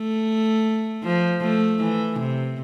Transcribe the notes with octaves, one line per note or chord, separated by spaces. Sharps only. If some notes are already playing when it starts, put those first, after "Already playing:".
Already playing: A3
F3
A3
E3
C3